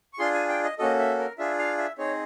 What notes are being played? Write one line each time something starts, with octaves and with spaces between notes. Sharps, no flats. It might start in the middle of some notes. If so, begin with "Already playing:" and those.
C#6
D4 F4 G#4 C6
G#5
G5
D#5
A#3 C#4 F#4 A4 D#5
E5
A#4
D4 F4 G#4 E5
F5
E5
C4 D#4 G#4 C#5